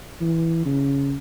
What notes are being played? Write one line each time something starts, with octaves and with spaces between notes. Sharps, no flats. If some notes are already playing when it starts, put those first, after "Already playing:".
E3
C#3